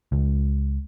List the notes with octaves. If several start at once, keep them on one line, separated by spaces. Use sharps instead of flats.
C#2